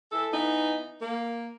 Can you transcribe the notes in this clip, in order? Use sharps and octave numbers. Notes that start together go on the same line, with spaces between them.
E3 A4
E3 B3 D#4
A#3